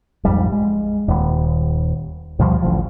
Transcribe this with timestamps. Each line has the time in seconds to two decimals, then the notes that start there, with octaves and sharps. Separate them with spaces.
0.25 A#1 F2 G#2 G3
0.52 G#3
1.08 D#1 D#2
2.39 D2 B2 F3 G3
2.62 A1 D2 F3